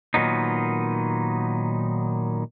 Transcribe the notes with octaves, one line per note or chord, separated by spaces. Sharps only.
A#2 D#3 F#3 B3 D#4